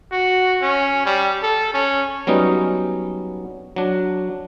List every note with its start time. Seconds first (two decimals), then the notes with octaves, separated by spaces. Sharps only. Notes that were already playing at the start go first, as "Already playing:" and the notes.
0.12 F#4
0.62 C#4
1.06 G3
1.43 A4
1.74 C#4
2.27 F#3 G3 B3 C#4 D#4
3.76 F#3 D4